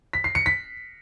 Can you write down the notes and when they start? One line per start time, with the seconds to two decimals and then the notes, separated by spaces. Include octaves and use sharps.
0.13 B6
0.24 C7
0.35 C#7
0.46 B6